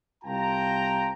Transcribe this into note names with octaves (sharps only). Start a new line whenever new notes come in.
C2 F4 G5 A5 A#5